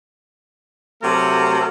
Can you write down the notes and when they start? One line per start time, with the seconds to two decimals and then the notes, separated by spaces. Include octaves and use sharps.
1.02 C3 F#3 A3 F#4 A4 A#4